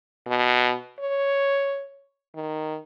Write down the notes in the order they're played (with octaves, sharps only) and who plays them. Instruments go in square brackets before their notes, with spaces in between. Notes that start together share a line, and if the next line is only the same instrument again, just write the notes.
[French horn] B2
C#5
D#3